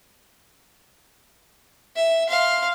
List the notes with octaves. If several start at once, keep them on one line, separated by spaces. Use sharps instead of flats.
E5
F5 C6